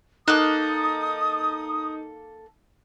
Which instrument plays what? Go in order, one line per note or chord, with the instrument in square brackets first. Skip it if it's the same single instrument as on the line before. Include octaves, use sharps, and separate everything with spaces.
[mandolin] A#3 A4 F#6 [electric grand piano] D#4 [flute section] D#6